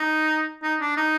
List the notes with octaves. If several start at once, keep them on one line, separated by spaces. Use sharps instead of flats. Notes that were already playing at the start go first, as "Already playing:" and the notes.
Already playing: D#4
D#4
D4
D#4